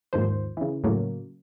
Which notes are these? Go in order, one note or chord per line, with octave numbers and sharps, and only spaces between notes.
D#2 G#2 D#3 F3 C5
C#3 E3
A2 C#3 F#3 A#3